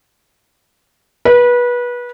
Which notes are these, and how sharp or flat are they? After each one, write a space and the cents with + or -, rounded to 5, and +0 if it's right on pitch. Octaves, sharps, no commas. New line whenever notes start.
B4 -25